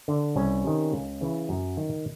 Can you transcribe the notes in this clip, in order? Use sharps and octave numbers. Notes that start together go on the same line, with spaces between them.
D3
C2 C#4
C3 D#3
C#2
C#3 E3
F#2
D#3